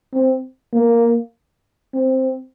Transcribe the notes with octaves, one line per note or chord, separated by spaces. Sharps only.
C4
A#3
C4